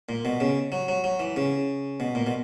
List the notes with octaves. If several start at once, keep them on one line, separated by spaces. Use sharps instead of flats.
A#2
B2
C#3
F#3
F#3
F#3
E3
C#3
B2
A#2
B2